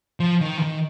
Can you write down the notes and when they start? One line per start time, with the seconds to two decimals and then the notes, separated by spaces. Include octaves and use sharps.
0.20 F3
0.41 D#3
0.58 E3
0.62 D#3